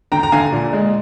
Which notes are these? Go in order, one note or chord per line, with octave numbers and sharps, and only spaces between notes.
D3 G5 A#5
A#5
D3 F5 G#5
A#2
G#3